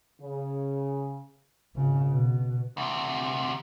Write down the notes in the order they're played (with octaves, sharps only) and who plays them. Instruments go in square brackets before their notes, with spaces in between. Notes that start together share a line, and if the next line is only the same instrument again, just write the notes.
[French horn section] C#3
[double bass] G#1 C#3
B2
[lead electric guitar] D2 C3